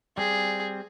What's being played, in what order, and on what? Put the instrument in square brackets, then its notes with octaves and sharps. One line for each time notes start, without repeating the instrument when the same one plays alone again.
[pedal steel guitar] G3 C4 [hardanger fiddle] G#4